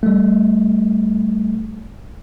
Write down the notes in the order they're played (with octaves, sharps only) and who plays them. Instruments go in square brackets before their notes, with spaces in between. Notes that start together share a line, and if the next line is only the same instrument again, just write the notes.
[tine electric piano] G3 A3